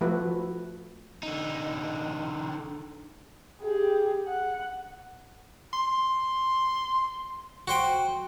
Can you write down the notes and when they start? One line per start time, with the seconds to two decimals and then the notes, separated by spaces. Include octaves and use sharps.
0.01 F3 A3 E4 F#4 B4
1.23 D3 D#4
3.62 G4 G#4
4.28 F#5
5.73 C6
7.68 F#4 C5 G5